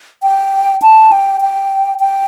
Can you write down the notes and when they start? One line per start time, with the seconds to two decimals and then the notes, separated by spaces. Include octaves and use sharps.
0.23 G5
0.82 A5
1.12 G5
1.41 G5
2.00 G5